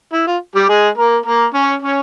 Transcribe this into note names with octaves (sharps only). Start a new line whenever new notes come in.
E4
F4
G3 G4
G#3 G#4
A#3 A#4
A#3 A#4
C#4 C#5
C#4 C#5